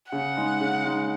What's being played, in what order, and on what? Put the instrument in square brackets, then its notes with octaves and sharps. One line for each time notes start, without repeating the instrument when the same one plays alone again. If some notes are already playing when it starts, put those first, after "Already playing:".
[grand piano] C#3 [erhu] F#5
[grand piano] G#3 D#4
C#3
G#3 D#4